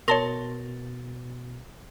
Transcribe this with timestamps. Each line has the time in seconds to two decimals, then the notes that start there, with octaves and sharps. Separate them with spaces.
0.08 B2 A#4 C#5 A5 C6 A6 A#6 G7